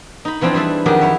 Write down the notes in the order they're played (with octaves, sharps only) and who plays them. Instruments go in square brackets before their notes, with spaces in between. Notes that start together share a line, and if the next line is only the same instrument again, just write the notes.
[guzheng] D#4 B5
E3 F3 C4 D4 E4 F4
G3 G#4 B4 E5
F2 D#3 F#3 G4 G#4
E4 C#5 E5